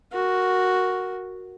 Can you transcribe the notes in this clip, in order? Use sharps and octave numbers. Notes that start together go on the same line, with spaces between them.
F#4 A#4